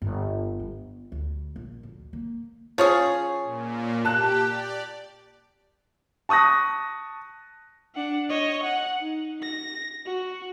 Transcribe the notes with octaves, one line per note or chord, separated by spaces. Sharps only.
G1
B3
D2
A#1
D2
A#3
F3 C#4 G#4 C#5
A#2
G4 A5 F#6
D5
A5 C#6 D#6 F#6 A#6
D4 F#5
C#5 D#5
F#5
D#4
A#6
F#4